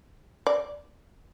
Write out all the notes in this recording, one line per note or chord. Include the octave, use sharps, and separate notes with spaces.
D5